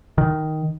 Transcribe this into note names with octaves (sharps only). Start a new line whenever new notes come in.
D#3